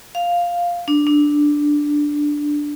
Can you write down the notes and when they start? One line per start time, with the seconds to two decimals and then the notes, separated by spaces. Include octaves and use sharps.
0.15 F5
0.88 D4
1.07 D4